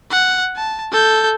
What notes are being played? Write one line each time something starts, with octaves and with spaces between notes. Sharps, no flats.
F#5
A5
A4 G6